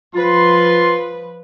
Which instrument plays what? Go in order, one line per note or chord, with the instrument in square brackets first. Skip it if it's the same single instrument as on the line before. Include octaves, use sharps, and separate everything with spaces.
[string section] F3 B4 [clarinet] F4 [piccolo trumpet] C6